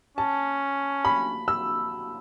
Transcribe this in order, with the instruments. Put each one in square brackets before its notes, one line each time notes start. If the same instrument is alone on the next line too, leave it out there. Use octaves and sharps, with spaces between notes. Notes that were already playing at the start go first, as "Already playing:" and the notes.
[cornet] C#4 [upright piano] A5
[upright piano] B5
E6